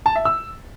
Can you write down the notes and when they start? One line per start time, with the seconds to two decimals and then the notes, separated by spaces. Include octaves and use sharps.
0.06 A5
0.16 E5
0.25 E6